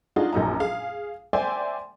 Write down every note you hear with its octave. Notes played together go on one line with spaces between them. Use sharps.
D4 D#4 F4 F#4 G#4
A#1 F#2 D#4 A#5
G#4 F5
C5 D5 E5 G5 G#5 C6